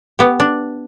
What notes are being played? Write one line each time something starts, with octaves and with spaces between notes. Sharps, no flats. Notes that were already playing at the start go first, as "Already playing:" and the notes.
B3 G4
D4